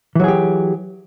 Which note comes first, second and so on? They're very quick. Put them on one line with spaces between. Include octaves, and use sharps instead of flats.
E3 F#3 G#4 G4